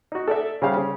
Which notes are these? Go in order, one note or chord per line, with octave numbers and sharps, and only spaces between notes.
D#4 F#4
A4 D5 E5
C#3 G3 C5 F5
C#3